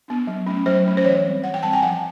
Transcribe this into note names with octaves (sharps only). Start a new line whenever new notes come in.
B3 D4
F#3
A3 C#4
F#3 C5
A3 C#4
C5
E3 C#5
G3 C4
E3 F#5
G5
G3 C4 A5
G#5
F3 F#5